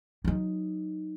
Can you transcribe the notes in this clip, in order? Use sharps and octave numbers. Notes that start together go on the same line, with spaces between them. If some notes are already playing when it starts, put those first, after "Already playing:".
F#3 D#4